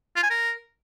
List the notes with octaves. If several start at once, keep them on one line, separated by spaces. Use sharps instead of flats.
F4
G#5
A#4